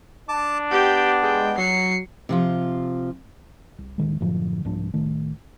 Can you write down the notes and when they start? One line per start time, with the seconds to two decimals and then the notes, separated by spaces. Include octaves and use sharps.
0.29 D4 A5 D6
0.71 B3 G4 G5
1.23 G#3 G5
1.58 F#3 C7 C#7
2.29 C3 F3 F4
3.78 C2
3.98 D1 E2 D#3 G#3
4.20 F#2 A2 D3 F3
4.65 C2 G#2 F3 D4
4.94 C2 A2 D#3 A3